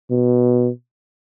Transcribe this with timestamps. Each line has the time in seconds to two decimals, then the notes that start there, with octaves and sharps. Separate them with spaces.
0.11 B2